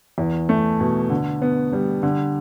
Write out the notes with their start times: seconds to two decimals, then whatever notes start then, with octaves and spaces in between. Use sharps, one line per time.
0.18 E2
0.49 A3
0.80 B2
1.10 D3
1.42 B3
1.73 G3
2.03 D3